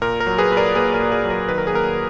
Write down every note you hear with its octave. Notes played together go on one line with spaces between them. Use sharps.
A#2 A#4
A#4
F#3
G#4 B4
A#2 B4
A#4 D5
A#3 G#4 B4
A#4
A#2
G#4
F#3
A#4
D#3 B4
A#4
G#4
A#3 A#4